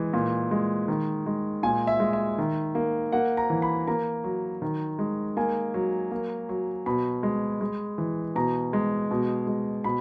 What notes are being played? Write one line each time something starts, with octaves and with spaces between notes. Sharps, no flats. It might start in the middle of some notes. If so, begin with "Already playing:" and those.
Already playing: E3 G#3
A#2
G#3
D#3
G#3
A#2 G#5
E5
G#3
E5
D#3
A#3
A#3 F#5
A#5
E3
B5
A#3 A#5
F#3
D#3
G#3
A#3 G#5
F#3
A#3
F#3
B2 B5
G#3
G#3
E3
B2 A#5
G#3
B2
G#3
B2 B5